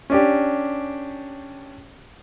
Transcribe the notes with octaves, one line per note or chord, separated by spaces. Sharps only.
C#4 D4 G4